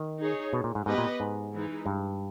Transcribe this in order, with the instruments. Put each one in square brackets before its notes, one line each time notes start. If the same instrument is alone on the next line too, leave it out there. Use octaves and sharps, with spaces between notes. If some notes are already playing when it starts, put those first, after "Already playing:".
Already playing: [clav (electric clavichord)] D#3
[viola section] D#4 G#4 C#5
[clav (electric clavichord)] B2
A#2
G#2
[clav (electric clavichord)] G#2 [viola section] B3 G4 B4 D#5
[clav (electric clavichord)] A#2
G#2
[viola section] E3 G#3 D#4
[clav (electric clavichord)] G2